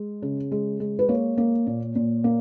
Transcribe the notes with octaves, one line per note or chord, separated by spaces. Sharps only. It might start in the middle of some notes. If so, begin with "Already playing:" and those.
Already playing: G#3
C#3
G#3
G#3
B4
A#3 C#5
A#3
A#2
A#2
A#3